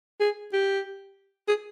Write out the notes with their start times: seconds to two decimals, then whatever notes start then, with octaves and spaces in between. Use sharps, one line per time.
0.20 G#4
0.53 G4
1.48 G#4